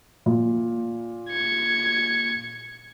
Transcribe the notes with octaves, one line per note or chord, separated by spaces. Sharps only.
A#2
G#6 C#7